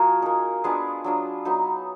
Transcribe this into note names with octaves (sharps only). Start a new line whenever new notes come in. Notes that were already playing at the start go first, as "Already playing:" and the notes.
Already playing: F3 A#3 F#4 G#4 A#4
A#3 D#4
G#3 B3 D4 F4 G#4
F#3 D4 F4
F#3 B3 D#4